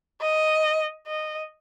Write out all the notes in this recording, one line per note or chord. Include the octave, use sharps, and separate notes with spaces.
D#5
D#5